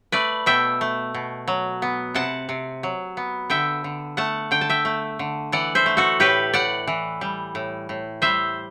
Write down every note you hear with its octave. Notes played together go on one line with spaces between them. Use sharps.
A3 B4 D5
B2 E5 G5
A3
B2
F#3
B3
C3 F#5 A5
C3
F#3
B3
D3 E5 G5
D3
A3 F#5 A5
D3 G5
A5
E5 G5
A3
D3
E3 D5 F#5
C5 E5
A3
F#4 A4
A2 G4 B4
A2 D5 F#5
E3
G3
A2
A2
G3 C5 E5